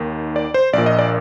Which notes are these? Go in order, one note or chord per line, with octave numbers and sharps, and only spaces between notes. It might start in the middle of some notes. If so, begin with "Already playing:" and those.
Already playing: D#2 D#3
D5
C5
A#1 A#2 D5
D#5
D5